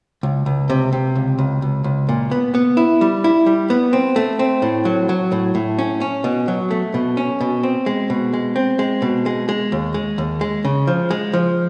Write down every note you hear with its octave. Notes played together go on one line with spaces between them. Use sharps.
C#2
C#2
C3
C3
C#2
C#2
C#2
C#2
A#2
B3
B3
E4
G3
E4
G3
B3
C4
A3
C4
A2
F#3
F#3
A2
A2
C#4
C#4
B2
F#3
A3
B2
C#4
B2
C4
G#3
B2
G#3
C4
G#3
B2
G#3
G#3
D#2
G#3
D#2
G#3
C#3
F3
G#3
F3